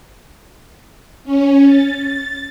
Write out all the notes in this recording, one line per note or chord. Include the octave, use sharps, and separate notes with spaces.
C#4
A6